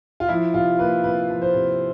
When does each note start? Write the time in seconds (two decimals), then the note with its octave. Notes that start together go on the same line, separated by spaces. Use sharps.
0.20 F4
0.29 F3 E4
0.54 C3 F4
0.79 A#3 B4
1.04 C3 B4
1.30 F3
1.42 C5
1.54 C3